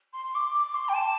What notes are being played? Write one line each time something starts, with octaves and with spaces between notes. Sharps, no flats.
C6
D6
D6
C6
G5
A5